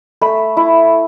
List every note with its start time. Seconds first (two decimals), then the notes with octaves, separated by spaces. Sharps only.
0.21 A3 B5
0.57 E4